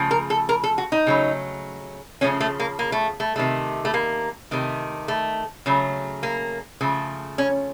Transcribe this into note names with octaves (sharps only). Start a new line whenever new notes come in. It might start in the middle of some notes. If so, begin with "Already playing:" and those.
Already playing: C#3 F3 A3
A#4
A4
A#4
A4
F#4
D#4
C#3 F#3 A3
C#3 F3 A3 C#4
A3
A#3
A#3
A3
A3
C3 D#3 A3
A3
A#3
C3 D#3 A3
A3
C#3 F#3 A3
A#3
C#3 F3 A3
C#4